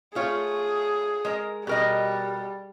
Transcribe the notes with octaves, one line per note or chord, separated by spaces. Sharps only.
A3 F4 G#4 C#5
G#3 A#4
B2 G3 A#4 D#5